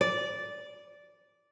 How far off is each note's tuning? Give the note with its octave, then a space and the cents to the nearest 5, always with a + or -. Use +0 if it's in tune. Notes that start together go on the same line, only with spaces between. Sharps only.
D5 -10